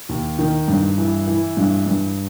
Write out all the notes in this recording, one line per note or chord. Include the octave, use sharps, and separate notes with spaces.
D#2
D#3
G2
E3
E3
G2
G2